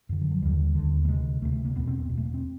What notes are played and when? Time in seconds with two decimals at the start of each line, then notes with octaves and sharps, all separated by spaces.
0.09 F#2 D3
0.21 F3
0.31 F#3
0.42 D#2 D3 G3
0.75 D#2 D3
1.05 A3
1.08 C3 G#3
1.14 D2
1.42 D2 A3
1.45 C3
1.53 A3
1.65 A#3
1.75 E2 B2 B3
1.87 C4
1.98 B3
2.09 E2 B2
2.18 A3
2.26 A#3
2.34 C4